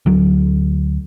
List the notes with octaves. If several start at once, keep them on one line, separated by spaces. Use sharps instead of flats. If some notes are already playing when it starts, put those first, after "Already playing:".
D2 F#3